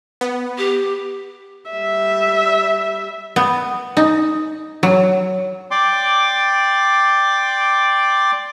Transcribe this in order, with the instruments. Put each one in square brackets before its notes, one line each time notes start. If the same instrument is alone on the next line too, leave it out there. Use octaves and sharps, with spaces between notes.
[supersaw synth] B3
[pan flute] G4
[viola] G3 E5
[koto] B3
D#4
F#3
[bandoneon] D5 G5 C6 D6